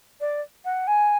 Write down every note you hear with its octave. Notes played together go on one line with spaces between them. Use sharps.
D5
F#5
G#5